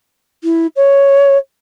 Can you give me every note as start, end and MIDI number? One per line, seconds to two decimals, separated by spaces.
0.44 0.67 64
0.76 1.37 73